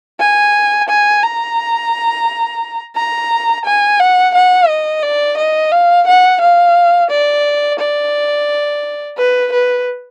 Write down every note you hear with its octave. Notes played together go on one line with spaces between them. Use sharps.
G#5
G#5
A#5
A#5
G#5
F#5
F#5
D#5
D5
D#5
F5
F#5
F5
D5
D5
B4
B4